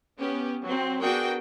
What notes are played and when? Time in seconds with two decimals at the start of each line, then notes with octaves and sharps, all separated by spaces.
0.21 B3 C#4 G4
0.64 F#3 C4
1.02 B3 D4 F#4 G#4 A#4 G5